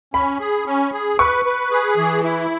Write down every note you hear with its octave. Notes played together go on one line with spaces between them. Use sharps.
C#4 B5
G#4
C#4
G#4
B4 C#6
B4
G#4
E3
E4